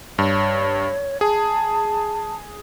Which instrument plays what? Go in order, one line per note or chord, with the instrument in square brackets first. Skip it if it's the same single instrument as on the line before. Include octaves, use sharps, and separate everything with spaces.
[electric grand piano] G2 [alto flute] C#5
[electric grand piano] G#4 [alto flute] A5